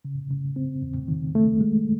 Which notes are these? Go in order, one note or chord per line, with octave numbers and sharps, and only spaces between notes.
C#3
C#3
C4
E2
D#3
A3
G#3